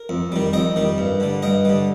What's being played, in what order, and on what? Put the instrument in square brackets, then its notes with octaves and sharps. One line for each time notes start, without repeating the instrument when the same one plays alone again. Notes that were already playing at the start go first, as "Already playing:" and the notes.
Already playing: [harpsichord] A#4
F2
D#3 G3
F2 D#5 G5
D#3 G3
G2
D3 G3
G2 D#5 G5
D3 G3